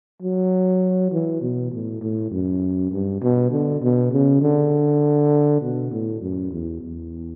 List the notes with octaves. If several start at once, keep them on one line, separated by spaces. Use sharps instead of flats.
F#3
E3
B2
A2
A2
F#2
G2
B2
D3
B2
C#3
D3
B2
A2
F#2
E2
E2